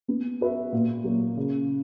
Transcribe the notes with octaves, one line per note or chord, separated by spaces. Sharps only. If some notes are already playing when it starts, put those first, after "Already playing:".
B3
F#4 B4 E5
A#2
F#3 A#3
C#3